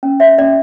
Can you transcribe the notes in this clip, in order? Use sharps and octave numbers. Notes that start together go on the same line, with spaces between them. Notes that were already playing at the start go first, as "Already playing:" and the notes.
C#4
C#5 E5
C#4 D5